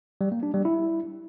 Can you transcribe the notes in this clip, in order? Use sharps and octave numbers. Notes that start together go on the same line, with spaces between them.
G3
A#3
D4
G3
E4